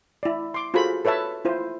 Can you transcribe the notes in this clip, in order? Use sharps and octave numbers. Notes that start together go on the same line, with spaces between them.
E4 D5
C6 D6
F4 F#4 G#4 A4 C5 B5
A4 B4 C#5 E5 A5
E4 F4 C5